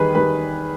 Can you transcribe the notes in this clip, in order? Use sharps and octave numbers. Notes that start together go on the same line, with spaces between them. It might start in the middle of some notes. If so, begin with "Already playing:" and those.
Already playing: E2 D#3 G3 G#4 B4
D#3 G3 B4